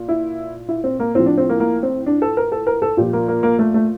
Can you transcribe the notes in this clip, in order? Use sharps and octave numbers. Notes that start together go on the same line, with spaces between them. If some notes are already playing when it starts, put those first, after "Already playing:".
Already playing: A#2
E4
E4
C4
A#3
A2 F3 C4
D4
C4
A#3
A#3
C4
D4
A4
A#4
A4
A#4
A4
A#2 F3 G4
A#3
A#3
A#3
A3
A3